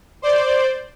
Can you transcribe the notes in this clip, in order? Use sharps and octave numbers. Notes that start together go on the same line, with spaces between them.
C5 D5 G6